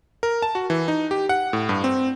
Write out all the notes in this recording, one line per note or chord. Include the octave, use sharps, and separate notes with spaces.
A#4
A5
F#4
E3
D#4
G4
F#5
A2
G2
C4